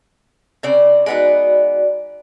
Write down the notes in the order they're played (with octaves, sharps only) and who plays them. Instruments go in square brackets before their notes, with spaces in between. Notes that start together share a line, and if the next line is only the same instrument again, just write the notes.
[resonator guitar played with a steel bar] C#3 C4 D5
[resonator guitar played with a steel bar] G#3 B3 D#4 [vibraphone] F#4 D5